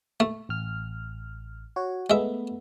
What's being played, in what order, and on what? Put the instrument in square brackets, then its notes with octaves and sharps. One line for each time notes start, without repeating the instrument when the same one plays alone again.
[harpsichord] A3
[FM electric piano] A1 F6
F#4 C#5
[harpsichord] G#3 E5 [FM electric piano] A3 B3